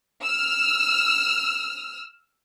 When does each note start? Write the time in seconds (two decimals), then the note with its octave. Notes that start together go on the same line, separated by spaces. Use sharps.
0.23 E6 F6